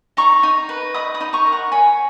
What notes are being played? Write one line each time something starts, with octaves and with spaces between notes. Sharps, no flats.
D#4 A#5 C#6
D#4
B4
D#5 B5 D#6
B5 D#6
D#4
A#5 C#6
A#4
F#5 A#5
C#5 G#5 B5